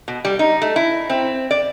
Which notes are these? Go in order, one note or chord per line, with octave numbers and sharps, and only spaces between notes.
B2
G3
D#4
A3
E4
C4
D5